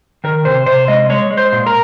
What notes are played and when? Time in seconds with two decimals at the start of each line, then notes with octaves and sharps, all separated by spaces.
0.24 D#3 A#4
0.45 C3 C5
0.66 C3 C5
0.88 G#3 D#5
1.09 G#3 C#5
1.31 G#3
1.37 C5
1.52 A#2
1.67 A#4